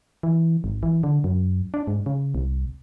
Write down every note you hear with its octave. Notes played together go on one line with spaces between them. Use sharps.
E3
G#1
E3
D3
F#2
D4
G#2
C#3
C2